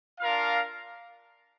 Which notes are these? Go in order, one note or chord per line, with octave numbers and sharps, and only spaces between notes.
D4 F4 A#4 F5